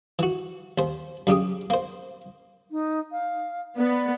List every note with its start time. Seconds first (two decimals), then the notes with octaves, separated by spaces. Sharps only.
0.19 E3 F#4
0.78 D#2 C5
1.27 F#2 C#3 G4 D#6
1.70 A#3 C5
2.71 D#4
3.12 F5
3.77 B3 D5